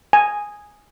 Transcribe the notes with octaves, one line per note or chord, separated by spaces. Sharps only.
G#5